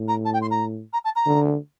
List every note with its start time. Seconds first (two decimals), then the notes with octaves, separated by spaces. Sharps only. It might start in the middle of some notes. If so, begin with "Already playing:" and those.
Already playing: A2
0.08 A#5
0.25 A5
0.33 G5
0.42 C6
0.51 A#5
0.93 A#5
1.04 A5
1.16 A#5
1.27 D3